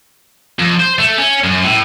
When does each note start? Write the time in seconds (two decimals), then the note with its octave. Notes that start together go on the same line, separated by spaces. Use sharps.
0.59 F2
0.80 C5
0.99 A3
1.18 C#4
1.44 F#2
1.64 A2